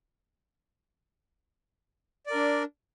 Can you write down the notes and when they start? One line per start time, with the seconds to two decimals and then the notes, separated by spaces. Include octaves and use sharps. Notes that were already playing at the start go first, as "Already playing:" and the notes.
2.26 D5
2.30 A#4
2.35 D4